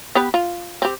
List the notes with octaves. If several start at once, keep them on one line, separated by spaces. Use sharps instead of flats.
B3 G4 B4
F4
C4 G4